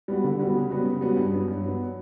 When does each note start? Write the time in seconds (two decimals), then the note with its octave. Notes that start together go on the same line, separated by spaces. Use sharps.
0.08 G3 B3 F#4
0.24 D3
0.39 G3 B3 F#4
0.55 C#3
0.70 G3 B3 F#4
0.86 C#3
1.01 G3 B3 F#4
1.17 G2
1.32 F#3 B3
1.48 G2
1.63 F#3 B3